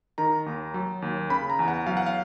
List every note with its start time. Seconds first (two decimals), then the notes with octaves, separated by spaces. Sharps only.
0.18 D#3 A#5
0.46 D#2
0.74 F#3
1.02 D#2
1.30 C#3 B5
1.50 A#5
1.59 E2
1.68 F#5
1.86 F#3 F5
1.97 F#5
2.06 F5